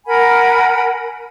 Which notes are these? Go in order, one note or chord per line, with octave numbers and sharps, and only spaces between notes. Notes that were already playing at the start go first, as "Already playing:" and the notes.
A#4 F#5 G#5 B5